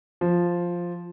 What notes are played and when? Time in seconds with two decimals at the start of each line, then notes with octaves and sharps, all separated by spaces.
0.21 F3